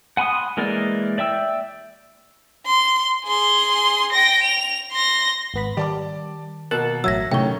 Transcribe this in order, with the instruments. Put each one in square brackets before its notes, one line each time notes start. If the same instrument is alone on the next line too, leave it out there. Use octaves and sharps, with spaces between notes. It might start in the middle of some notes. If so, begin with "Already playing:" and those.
[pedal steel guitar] F#5 G#5 B5 C6 D#6
E3 G#3 A#3 A#4 D5
D5 E5 G5 E6
[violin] C6
G#4 C6
G5 A#6
F7
C6 A#6
[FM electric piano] G#1 B3 B5
[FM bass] D#3 [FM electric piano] G3 [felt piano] D5 A5 D6
[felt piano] B2 A#3 [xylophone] A#4 [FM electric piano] F#5 A5
[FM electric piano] A1 F#3 [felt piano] E5 [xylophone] E6 G#6 A#6
[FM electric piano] A2 [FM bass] C3 [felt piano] D#3 F#3 C#4 [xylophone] G5 C#6